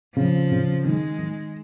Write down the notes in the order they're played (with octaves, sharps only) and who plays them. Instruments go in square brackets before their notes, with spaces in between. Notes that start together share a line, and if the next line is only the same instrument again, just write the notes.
[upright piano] C#3 [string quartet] F3
[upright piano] C#3
[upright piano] D#3 [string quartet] G#3
[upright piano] D#3